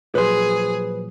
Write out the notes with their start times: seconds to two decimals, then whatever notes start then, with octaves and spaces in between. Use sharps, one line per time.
0.15 A#2 F3 F#3 G#4 B4 C5